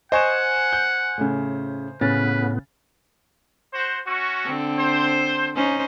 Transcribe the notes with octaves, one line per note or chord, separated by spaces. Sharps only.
C5 D#5 F#5 G#5 C#6 E7
G6
A2 C#3
A2 C#3 B3 C#4 B4 A6
F#4 C5
C#4 F#4
D3 C4 A4
C5
C#4 D#4 C5